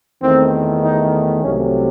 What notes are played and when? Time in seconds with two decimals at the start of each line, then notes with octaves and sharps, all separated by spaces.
0.23 E2 D#3 A3 C4
0.83 D#4
1.43 C2 C3 F#3 A3 C#4